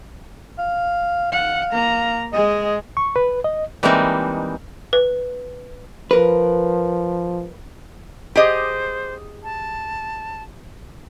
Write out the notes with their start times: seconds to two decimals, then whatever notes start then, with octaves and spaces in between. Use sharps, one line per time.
0.58 F5
1.32 F5 F#5
1.72 A#3 A#5
2.33 G#3 G#4 D#5
2.97 C#6
3.16 B4
3.44 D#5
3.83 E3 G3 G#3 A#3 C4 D#4
4.93 B4
6.11 F3 A#4 B4
8.36 G4 G#4 C5 D#5
9.44 A5